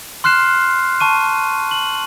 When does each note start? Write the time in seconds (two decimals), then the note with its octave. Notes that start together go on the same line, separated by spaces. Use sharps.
0.24 C6 F6 F#6 C7 E7
1.00 A5 C#6 D#7
1.71 F#7